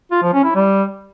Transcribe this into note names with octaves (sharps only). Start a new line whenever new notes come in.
F4
F3
C#4
E4
G3